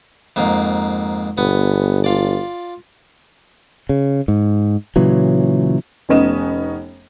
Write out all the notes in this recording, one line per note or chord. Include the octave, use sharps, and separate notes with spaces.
F2 G#2 A#3
G1 B3
F4 D5
C#3
G#2
A#2 C#3 E3 F#3
F1 D#3 B3 C#4 D#5 E7